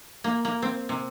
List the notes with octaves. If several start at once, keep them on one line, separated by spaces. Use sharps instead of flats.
A#3
A#3
C4
C3